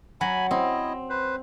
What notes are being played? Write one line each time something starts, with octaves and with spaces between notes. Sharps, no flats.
F#3 G#5 B5
C4 E4 D#5
B4 C5